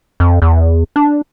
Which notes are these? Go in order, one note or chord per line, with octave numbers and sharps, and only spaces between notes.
F2
E2
D4